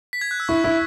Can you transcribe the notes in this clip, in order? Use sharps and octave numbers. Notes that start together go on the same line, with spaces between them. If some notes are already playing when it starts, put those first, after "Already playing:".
B6
G#6
F#6
E6
E4 C#6
E4